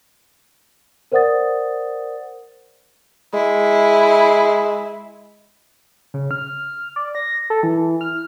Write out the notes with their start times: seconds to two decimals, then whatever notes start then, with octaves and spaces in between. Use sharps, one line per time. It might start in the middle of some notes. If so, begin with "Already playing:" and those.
1.12 A#4 C5 D5 F#5 D#6 A6
3.34 G#3 E4
6.14 C#3
6.31 F6
6.96 D5
7.15 A#6
7.50 A4
7.63 E3
8.01 F6